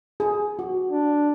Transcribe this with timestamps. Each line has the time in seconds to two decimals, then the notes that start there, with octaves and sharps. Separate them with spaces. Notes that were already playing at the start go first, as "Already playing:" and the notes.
0.20 G#4
0.59 F#4
0.91 D4